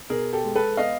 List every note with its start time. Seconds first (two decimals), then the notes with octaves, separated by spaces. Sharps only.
0.10 B2 G#4 A#4
0.33 G4 A4
0.44 G#3
0.56 A4 B4
0.77 B3 D#5 F5